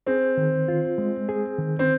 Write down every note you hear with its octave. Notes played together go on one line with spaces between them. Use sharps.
C4 G#4
D#3
F4
G#3
G#4
D#3
C4